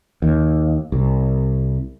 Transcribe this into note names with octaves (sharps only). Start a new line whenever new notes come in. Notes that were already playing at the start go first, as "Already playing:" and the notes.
D#2
C2